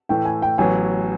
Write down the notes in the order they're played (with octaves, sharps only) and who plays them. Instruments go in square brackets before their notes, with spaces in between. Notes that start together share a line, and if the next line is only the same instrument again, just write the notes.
[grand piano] A2 E3 A3 [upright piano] G5
[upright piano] G#5
G5
[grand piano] A1 A2 F#3 B3 [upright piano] G#5